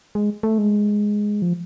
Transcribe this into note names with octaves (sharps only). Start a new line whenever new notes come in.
G#3
A3
G#3
F3